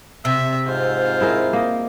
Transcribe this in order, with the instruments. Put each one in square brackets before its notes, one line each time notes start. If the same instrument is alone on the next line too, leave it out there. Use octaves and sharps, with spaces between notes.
[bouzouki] C3 [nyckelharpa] E5
[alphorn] G#2 [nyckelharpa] F4 C5
[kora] E4 G#4 A#4
A#3 D#5